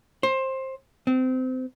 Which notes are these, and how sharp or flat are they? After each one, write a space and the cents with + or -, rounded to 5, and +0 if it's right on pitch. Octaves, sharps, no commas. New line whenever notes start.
C5 +20
C4 -25